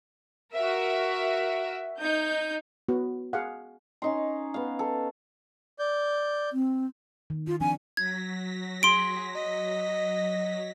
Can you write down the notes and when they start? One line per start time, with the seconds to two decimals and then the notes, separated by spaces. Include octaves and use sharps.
0.54 F#4 A#4 E5
2.00 D#4 G6
2.88 B3 F#4
3.33 G#4 F5 F#5
4.02 C#4 D#4 C6
4.54 B3 F5
4.79 A4
5.79 D5 G6
6.53 C4
7.30 D#3
7.47 D#3 F4
7.60 F3 C4 D4 G#5
7.97 F#3 G#6 A#6 B6
8.83 G#4 C6 D7
9.35 D#5